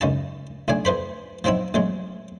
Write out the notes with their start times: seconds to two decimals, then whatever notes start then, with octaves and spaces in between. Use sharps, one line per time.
0.01 C#2 F#2 D#4 A5
0.68 B1 A2 D4 G#5
0.85 F2 B4 C5 B5
1.44 F3 F#3 C4 D#4 E4
1.74 A1 F#3 G#3